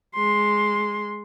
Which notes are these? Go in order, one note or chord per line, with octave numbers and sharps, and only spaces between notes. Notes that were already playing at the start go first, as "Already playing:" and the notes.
G#3 C6